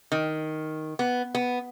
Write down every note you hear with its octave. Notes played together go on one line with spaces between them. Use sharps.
D#3
B3
B3